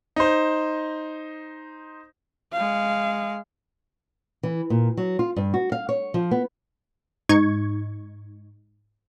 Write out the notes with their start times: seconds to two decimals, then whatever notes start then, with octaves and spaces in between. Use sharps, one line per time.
0.16 D#4 C5
2.53 G#3 F5
4.43 E3
4.70 A#2
4.97 F#3
5.19 F4
5.36 G2
5.54 F#4
5.72 F5
5.89 C#5
6.14 F3
6.31 B3
7.29 G#2 D#4 C#6 G#6